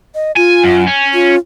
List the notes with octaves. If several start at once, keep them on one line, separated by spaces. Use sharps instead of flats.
D#5
F4 G#5
F#2
C#4
F4